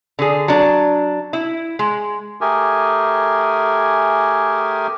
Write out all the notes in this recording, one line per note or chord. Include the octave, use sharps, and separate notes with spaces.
D3 G#4
F#3 D4
E4
G#3
A3 G4 G#4 A#4 G#5